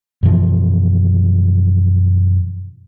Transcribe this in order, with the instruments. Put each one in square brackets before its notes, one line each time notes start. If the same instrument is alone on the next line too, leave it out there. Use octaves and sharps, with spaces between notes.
[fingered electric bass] F#2 B2 E3 F3